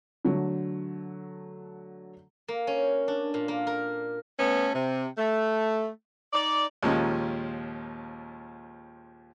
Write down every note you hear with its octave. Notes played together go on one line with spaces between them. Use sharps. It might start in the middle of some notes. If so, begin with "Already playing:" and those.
D3 F#3 A3
A#3
C#4
D4
A#2
A#3
A#4
A3 B3 C#4
C3
A3
D#4 D5
D#2 A#2 F3 G#3 C#4